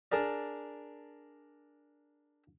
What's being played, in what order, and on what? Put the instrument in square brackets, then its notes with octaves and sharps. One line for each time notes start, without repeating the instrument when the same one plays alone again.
[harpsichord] D4 G#4 A#4 D5